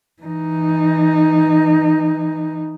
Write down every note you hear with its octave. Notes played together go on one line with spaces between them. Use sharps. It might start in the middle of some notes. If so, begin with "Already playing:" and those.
E3 D#4